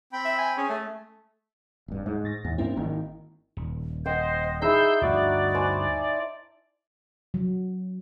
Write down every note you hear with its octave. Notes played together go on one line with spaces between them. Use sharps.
C4 G5 B5
E5
G#5
C#4 G#4 G#5
A3
D1 G2
G#2
A2 A6 A#6
D#2
G2 A#3 C4 C#4 E4
G#1 D#3
D#1
C5 D#5 F#5 G5
D#4 E4 G#4 C6 E6 G6
D2 G2 A3 F#4 D5
C5 G#5 A5
F#3